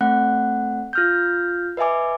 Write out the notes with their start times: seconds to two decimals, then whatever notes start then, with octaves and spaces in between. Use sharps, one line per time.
0.01 A3 C4 F#5 F#6
0.93 F4 F6 G6
1.77 B4 D#5 E5 G#5 D6